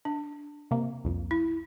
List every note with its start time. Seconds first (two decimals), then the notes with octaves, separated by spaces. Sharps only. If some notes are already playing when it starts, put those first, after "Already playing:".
0.05 D4
0.71 C3 A#3
1.04 C2 F2
1.31 E4